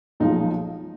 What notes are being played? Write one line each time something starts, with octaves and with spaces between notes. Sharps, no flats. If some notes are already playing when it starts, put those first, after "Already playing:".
B1 A#2 F3 G#3 D#4